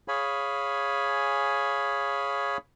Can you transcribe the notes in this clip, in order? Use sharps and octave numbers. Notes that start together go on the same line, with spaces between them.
G#4 C#5 F5 G#5 B5